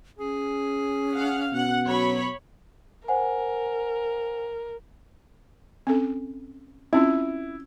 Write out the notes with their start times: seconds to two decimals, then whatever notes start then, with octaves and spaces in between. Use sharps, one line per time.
0.19 C#4 G#4
1.15 F5 F#5
1.53 B2 F#5
1.86 F#3 C#5 B5
3.08 A#4 C5 F#5 G#5
5.87 C4 C#4 A4
6.93 C4 C#4 E4 F4